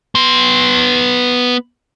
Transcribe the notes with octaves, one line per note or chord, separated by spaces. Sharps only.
B3 C6